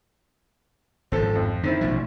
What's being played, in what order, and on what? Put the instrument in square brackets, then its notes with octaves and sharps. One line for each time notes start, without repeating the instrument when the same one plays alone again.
[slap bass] G#1 G#2 F3 [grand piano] C4 A4
[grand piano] F2
[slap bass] D3 [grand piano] D#3 C4 E4
[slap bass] A1 B2 F3